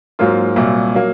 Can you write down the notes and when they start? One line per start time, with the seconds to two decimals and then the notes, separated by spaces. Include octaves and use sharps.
0.19 G#2 F#3 A#3 F4
0.56 C2 A#2 F#3
0.95 F#3 A#3